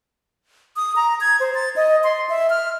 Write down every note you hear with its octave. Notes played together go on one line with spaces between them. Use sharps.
D#6
A#5
G#6
C5
A6
D#5
C6
E5
F6